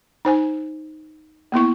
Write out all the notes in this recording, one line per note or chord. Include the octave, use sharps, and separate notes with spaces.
D#4 C5 G#5
A#3 B3 E4 C#6